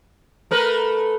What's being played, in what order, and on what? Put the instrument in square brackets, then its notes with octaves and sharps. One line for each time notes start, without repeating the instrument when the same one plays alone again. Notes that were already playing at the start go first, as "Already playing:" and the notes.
[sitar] A3 A#4 B4